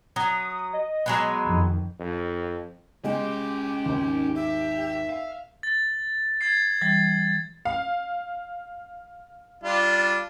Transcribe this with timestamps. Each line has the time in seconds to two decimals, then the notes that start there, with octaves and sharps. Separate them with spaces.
0.16 F#3 D#6
0.73 D#5
1.06 F#3 G#3 B3
1.44 F2 D#3
1.99 F2
3.04 G#3 C#4 G4 D#5
3.86 G#1 D#2
4.35 G4 E5
5.09 F5
5.63 A6
6.41 G#6 A6 C7
6.81 E3 G3 A6
7.65 F5
9.64 G3 D4 F4